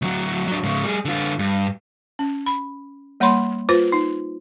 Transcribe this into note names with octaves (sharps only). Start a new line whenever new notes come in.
D2 F#3
F#3 D4
G#2 C#3
G3 G#4
D3 F4
G2
C#4
B5
G3 A#3 C#5 F#5 B5 C6
F4 B4 C5
D#4